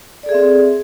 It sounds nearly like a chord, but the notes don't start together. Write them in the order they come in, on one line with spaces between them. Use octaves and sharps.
D5 A4 G#4 E5 C4